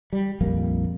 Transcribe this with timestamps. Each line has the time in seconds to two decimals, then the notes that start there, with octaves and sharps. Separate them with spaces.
0.13 G3
0.41 A#1 F2 G3 A#3